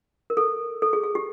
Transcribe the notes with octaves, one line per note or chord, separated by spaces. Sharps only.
A#4
A4
A4
G#4
G#4
G4